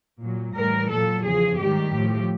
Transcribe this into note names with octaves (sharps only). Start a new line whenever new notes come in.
A#2 F#3
A2 E3 G3 A#4
A#2 F#3 A4
E2 C#3 F3 G#4
G#2 D#3 G3 G4
A2 F3